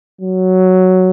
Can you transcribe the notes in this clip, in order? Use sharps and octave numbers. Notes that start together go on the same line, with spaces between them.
F#3